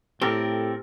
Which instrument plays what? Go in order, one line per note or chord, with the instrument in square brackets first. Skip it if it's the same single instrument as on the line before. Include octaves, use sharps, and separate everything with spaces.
[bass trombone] A2 [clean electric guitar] C4 A4 A#4 [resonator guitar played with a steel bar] G4